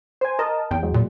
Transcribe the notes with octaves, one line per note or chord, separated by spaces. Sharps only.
C5 G#5
A#4 D#5 A5
E2 G5
F#3 G#3
A#2